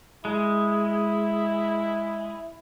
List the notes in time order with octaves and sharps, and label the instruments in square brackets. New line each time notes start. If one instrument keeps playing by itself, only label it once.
[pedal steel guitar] G#3 [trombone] E4